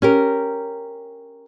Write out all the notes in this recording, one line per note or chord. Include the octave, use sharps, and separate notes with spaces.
C#4 G4 A#4